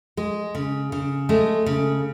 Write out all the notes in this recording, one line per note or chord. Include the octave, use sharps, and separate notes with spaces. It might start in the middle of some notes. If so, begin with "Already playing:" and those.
G#3
C#3
C#3
G#3 A3
C#3